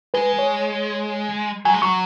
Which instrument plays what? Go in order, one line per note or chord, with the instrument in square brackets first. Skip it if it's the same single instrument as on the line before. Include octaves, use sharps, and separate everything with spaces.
[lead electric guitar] G#3 [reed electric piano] B4
[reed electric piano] C#5
[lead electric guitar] F#3 [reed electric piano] G#5
[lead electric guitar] G#3
[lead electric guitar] F#3 [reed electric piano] C#6